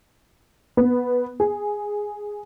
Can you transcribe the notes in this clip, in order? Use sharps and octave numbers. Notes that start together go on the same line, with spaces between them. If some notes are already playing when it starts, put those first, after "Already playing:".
B3
G#4